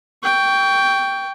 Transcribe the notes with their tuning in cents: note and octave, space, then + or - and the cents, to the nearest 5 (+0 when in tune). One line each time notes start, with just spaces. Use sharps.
G5 +0 C#6 +25